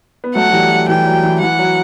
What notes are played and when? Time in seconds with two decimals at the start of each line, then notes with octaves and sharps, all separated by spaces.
0.24 B3
0.35 F#3 A3 F#5
0.49 F#3
0.53 E3 G3
0.71 F#3
0.89 E3 G3 G5
1.07 F#3
1.23 E3
1.41 E3 F#5
1.59 F#3